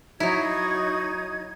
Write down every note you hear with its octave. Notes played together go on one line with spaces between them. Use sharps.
F#3 D#4 E4 F#4 G#6